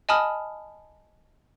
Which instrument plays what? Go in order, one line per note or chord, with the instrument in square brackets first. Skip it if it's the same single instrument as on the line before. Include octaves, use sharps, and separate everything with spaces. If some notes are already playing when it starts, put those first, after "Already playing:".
[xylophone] D#5 G#5 A5 B5 D#6 F6